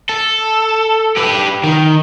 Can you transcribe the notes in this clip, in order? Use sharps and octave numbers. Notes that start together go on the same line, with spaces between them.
A4
G4 B4
D#3